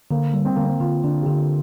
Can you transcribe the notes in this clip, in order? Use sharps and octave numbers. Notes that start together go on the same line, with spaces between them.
D3 A#3
G3
C4
D3 A#3
C4
D3 F4
D3 D4
G4
D3 F4